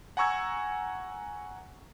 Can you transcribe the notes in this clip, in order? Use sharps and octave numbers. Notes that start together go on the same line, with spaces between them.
F#5 G#5 A#5 C#6 E6 G#6